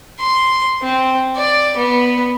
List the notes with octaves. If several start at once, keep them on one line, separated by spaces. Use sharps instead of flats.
C6
C4
D5
B3